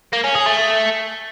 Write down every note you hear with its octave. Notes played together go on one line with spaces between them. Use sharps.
A#3
C#4
G#4
A3